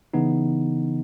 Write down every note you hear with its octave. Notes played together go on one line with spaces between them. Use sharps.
C#3 E3 B3 D#4